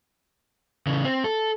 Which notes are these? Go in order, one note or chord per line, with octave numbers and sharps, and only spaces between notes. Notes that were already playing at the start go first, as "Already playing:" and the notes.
C#3 E3
C4
A4